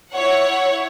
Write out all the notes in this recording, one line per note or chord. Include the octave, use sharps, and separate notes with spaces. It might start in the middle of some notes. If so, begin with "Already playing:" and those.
E4 C#5 F#5